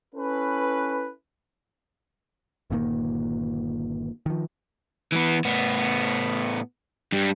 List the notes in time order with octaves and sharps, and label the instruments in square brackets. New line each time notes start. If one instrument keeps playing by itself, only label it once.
[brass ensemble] C#4 E4 A4 B4
[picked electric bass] G1 A#2 D#3 A#3
D#3 F3
[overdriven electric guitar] E3 B3
A2 B3
G2 G3